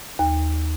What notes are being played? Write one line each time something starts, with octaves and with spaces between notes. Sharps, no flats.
D#2